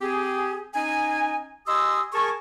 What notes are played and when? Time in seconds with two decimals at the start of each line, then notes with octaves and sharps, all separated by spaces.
0.01 C4 G4 G#4
0.75 C#4 D#4 D#5 G#5
1.68 G4 D#5 G#5 C6 D#6 E6
2.14 G#4 A#4 G#5 A5 C#6